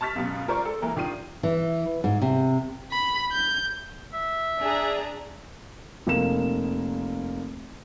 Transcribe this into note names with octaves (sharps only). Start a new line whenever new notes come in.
A5 C#6 F6 A6 B6
C#2 F#2 B2
F4 A#4 C5 D5 C#6
A4
E3 A#3 A#4
A#1 D#3 D4 F4 C7 D#7
E3
G#2
C3
B5
G6
E5
D4 G#4 A#5
F1 A#3 E7